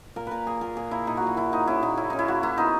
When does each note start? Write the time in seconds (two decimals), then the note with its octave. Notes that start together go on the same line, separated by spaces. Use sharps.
0.16 A#2 A#4
0.27 A#2 A#4 B4
0.46 A#3 G#4
0.61 A#2 A#4
0.77 A#2 G#4
0.91 A#3 E4
1.07 A#2 D#4
1.17 F#4
1.22 A#2 E4
1.37 A#2 E4
1.52 A#3 D#4
1.67 C#4 E4
1.82 A#2 D#4
1.97 C#4 E4
2.10 C#4 D#4
2.19 E4
2.28 A#3 F#4
2.43 A#3 E4
2.58 B3 D#4